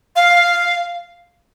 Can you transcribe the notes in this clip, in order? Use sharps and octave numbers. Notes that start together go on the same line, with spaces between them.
F5